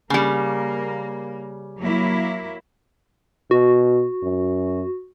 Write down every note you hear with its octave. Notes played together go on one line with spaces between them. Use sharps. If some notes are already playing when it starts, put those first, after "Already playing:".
C#3 G3 A#3
F#3 A#3 E4
B2 F#4
F#2